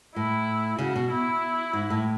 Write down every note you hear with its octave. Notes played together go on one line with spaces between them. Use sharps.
A2 E4
C#3 F#4
B2
E4
G#2
A2